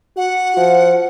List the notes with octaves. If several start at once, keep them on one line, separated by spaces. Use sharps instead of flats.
F#4 F#5
F3